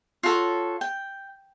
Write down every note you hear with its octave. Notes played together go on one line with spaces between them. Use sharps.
F4 F#4 A4 C#5
G5